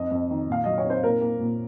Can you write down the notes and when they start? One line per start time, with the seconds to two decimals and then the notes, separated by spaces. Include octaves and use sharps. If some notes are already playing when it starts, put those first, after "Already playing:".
Already playing: F2 D#5
0.11 F2
0.30 D#3
0.48 A#2 F5
0.64 F#3 D#5
0.78 C#5
0.85 C4 C5
1.03 A#2 A#4
1.21 A#3
1.40 A#2